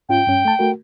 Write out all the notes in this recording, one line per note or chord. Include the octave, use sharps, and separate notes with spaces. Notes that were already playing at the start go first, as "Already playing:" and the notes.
G#2 C#4 F4 G5
G2 C#4
A3 A5
A3 F#4 A#4